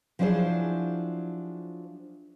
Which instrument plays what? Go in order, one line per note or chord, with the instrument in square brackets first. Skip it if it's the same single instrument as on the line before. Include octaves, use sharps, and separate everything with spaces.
[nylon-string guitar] F3 F#3 D4 E4 G#4 C5